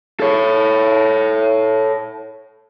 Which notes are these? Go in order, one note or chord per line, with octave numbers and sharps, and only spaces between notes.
A4 C#5